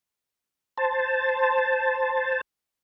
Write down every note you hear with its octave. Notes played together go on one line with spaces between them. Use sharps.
C5 A5